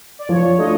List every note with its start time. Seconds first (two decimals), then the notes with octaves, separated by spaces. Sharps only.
0.19 D5
0.29 F3 C#5
0.58 A3 D4 F4 D#5